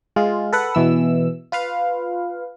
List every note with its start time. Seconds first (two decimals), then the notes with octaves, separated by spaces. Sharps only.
0.16 G#3 F4
0.53 A4 B4 F#5
0.75 B2 E3 E6
1.52 F4 B4 F5